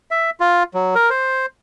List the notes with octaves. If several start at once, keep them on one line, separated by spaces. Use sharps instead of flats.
E5
F4
F#3
A#4
C5